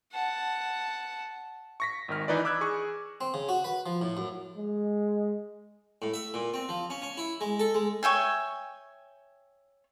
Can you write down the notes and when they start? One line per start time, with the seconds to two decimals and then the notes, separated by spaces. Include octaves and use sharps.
0.12 F#5 A5
1.80 C#6 A#6 B6
2.08 G#1 D#3 F6
2.28 E3 D#4 B4 D5
2.44 B5 D6 E6 F#6 G#6
2.61 G#4 C#6
3.21 C4
3.34 C#3
3.49 F#4
3.64 B4
3.86 F3
4.02 A2
4.17 F#2
4.57 G#3
6.02 A2
6.14 E5
6.34 A#2
6.54 C4
6.69 F3
6.90 C#4
7.02 C#4
7.17 E4
7.41 G#3
7.59 A4
7.74 G#3
8.03 C#5 E5 G5 G#5